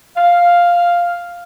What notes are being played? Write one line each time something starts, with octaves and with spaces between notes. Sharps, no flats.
F5